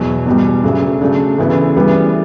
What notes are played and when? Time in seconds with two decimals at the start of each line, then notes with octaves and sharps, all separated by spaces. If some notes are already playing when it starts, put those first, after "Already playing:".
Already playing: E2 B2 F#3
0.26 E2 B2 G3
0.64 D2 C#3 F#3
1.01 C#3 F#3 A3 D4
1.38 D2 C#3 E3 B3 E4
1.76 D2 C#3 E3 G3 B3